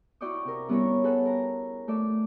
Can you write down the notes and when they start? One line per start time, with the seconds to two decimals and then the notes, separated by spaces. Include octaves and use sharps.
0.21 E4 F#4 D5 G5 C#6 D#6
0.45 C3 A#4
0.69 G3 B3 C#4 E4 A#4 C#5
1.04 G#4 A4 B4 F#5
1.25 A#4 A#5
1.88 A3 A4 D5